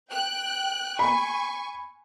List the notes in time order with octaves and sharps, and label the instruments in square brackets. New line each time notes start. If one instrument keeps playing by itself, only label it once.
[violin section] G5 F#6
[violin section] G#5 C#6 [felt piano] B5